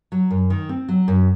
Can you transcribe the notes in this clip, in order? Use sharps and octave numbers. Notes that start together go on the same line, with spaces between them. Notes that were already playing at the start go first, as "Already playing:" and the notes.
F#3
F#2
D#3
C4
F#3
F#2